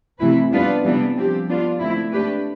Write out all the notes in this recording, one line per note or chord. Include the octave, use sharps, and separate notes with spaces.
C3 E3 A3 E4 B4
G3 B3 D4 F4 B4
C3 E3 G3 B3 D4
F3 C4 G4
B3 D4 F4
D3 A3 C4 E4
A3 D4 G4 B4